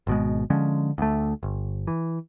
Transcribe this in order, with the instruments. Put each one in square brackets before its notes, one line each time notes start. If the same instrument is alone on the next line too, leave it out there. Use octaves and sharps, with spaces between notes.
[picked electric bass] G#1 B2 G#3
D3 F3 G#3 C#4
D2 A3
G1
E3